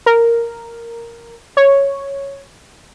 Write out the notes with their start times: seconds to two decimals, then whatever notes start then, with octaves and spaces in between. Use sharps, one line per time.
0.06 A#4
1.57 C#5